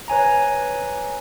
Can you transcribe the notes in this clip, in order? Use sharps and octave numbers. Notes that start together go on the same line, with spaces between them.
B4 C#5 G#5 A#5